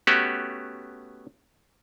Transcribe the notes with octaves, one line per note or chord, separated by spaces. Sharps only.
A3 B3 C#4 F#4 G4